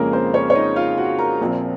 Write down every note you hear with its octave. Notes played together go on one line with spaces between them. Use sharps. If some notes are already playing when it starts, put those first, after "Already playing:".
Already playing: F2 C#3 G#3 A#3 C#4 A#4
C4 C5
C#4 C#5
C#5
D#4 D#5
F4 F5
F#4 F#5
A#4 A#5
A#1 A#2 F3 C4